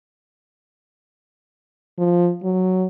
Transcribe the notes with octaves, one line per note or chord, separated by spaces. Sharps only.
F3
F#3